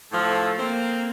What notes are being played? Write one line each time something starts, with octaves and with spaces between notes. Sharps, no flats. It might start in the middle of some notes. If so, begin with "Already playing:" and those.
A2 F3 A4
A#3 C4